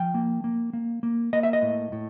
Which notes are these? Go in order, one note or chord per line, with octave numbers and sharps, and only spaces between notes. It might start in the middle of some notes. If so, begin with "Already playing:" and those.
Already playing: F3 G5
A#3
A#3
A#3
A#3
A#3 D#5
E5
D#5
A2
A2